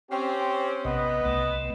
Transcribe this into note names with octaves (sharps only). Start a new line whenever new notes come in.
C4 C#4 G4
A#1 C3 B3 D#5
C2 C3 A3